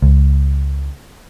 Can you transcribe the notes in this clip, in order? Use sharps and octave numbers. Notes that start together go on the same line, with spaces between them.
C#2